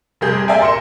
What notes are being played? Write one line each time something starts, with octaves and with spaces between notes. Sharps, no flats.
F1 G3 G4 G#4 G6
D5 E5 F5 G5 G#5
A#4 C6 C#7 E7